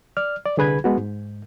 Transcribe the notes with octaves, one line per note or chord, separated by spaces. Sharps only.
D5 F6
D5
C2 D3 G#4 B4 B5 G#6
G#3 B3 F#4
G#2